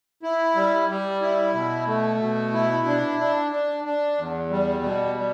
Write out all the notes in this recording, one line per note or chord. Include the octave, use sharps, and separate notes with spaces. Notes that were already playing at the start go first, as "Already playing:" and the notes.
E4
G3
G3
E4
B2
A3
B2
E4
D4
D4
D4
D4
E2
G3
B2
G3